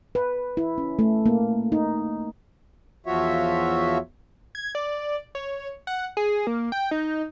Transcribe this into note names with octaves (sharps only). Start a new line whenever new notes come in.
B4
E4
C#4
A3
A#3
D#4
E2 F3 F4 F#4 C#5 E5
G#6
D5
C#5
F#5
G#4
A#3
G5
D#4